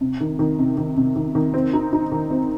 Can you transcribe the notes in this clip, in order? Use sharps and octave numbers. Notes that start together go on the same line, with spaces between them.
C3
D#3
D#3
C3
D#3
C3
D#3
D#3
C4
D#4
D#4
D#3
C4